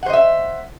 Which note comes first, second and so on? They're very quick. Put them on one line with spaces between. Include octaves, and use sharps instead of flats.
F#5 C5 D#5 E5